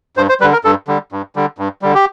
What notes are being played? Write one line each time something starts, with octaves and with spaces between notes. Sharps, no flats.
G2 C5
C5
D3 G3 B4
A#4
G2 A4
D3 G3
G2
D3 G3
G2
D3 G3
G4